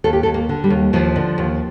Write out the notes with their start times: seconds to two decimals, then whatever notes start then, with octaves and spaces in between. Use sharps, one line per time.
0.04 D#2 A4
0.13 G4
0.23 A4
0.26 D#2
0.34 A#3
0.49 D3
0.64 G3
0.70 D#2
0.93 D#2 F3
1.16 D3
1.38 D#2